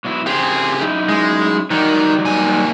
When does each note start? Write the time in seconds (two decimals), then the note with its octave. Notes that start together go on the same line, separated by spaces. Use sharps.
0.05 B2 F#3 E4
0.27 C#3 C4 G4 G#4
0.81 F#2 D#4 E4
1.09 G#3
1.71 D#3 F#3 G3 D#4
2.25 D#2 G#5